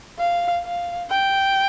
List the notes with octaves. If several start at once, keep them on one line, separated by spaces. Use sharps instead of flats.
F5
F5
G5